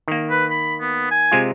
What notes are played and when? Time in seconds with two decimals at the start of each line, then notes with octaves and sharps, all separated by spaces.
0.08 D#3 A#3
0.30 B4
0.51 B5
0.80 B3
1.11 G#5
1.32 C3 G#3 F4